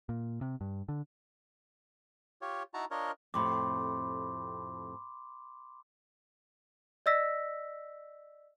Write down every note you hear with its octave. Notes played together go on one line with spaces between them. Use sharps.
A#2
C3
G2
D3
F4 G4 C#5
D#4 E4 F#4 A5 A#5
D4 F4 A#4 C#5 D#5
F2 A2 C3 B5 C6 D6
D5 D#5 E6 A#6 B6